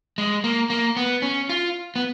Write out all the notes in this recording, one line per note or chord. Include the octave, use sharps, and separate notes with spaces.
G#3
A#3
A#3
B3
C#4
F4
B3